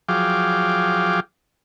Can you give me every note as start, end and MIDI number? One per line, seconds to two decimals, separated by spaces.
0.09 1.20 53
0.09 1.20 54
0.09 1.20 68
0.09 1.20 77
0.09 1.20 79
0.09 1.20 86